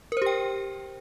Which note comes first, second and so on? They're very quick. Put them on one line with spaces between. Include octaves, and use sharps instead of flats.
A#4 C5 G4 G5